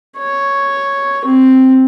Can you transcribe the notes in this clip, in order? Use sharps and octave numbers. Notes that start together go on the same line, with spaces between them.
C#5
C4